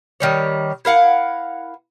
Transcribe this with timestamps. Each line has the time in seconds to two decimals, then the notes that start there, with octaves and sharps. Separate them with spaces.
0.20 D#3 G3 C#5
0.85 E4 A#4 F5 F#5